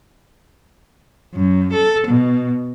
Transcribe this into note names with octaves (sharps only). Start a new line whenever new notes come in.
F#2
A4
B2